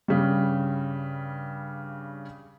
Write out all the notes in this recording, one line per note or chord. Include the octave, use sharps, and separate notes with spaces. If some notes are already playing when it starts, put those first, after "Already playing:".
G2 C#3 G3